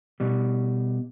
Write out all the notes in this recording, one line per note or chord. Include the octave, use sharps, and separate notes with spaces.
B2 G3